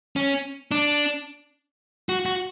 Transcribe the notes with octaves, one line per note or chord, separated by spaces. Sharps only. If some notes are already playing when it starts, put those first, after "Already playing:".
C#4
D4
F#4
F#4